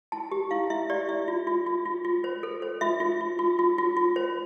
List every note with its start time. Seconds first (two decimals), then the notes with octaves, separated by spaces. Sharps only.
0.12 E4 A5
0.32 G4
0.51 E4 F5
0.70 E4 E5
0.90 G4 D5
1.09 E4 E5
1.28 F4
1.47 F4
1.66 F4
1.86 F4
2.05 F4
2.24 C5
2.43 A4
2.62 C5
2.81 F4 E5
3.00 F4
3.21 F4
3.39 F4
3.59 F4
3.78 F4
3.97 F4
4.16 C5